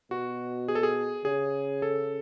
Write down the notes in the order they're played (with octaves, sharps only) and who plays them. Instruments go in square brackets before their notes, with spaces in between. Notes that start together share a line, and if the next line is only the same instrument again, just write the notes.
[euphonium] B2 [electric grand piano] F#4
[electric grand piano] G#4
A4
G#4
[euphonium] C#3 [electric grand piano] G#4
[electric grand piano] A4